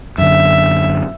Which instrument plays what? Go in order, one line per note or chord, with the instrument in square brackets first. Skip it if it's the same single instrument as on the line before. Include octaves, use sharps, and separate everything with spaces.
[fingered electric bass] F#2 D3 [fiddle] E5